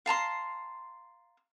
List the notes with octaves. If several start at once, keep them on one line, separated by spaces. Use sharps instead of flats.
F5 A5 A#5 C6